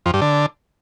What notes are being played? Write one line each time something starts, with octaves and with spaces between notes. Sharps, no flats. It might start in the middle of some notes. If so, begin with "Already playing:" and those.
F2
G2
D3